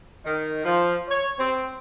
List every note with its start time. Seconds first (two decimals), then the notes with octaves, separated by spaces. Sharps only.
0.25 D#3
0.64 F3
1.09 C#5
1.38 C4